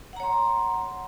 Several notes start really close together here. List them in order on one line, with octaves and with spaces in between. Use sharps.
F#5 A#5 C#5 C6